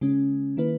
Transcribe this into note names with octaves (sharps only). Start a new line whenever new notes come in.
C#3 G#3 C#4
D#3 A#3 E4 B4